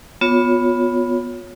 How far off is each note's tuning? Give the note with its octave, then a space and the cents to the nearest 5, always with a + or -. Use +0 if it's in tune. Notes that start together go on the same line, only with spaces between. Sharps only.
B3 +0 F4 +30 C#5 +5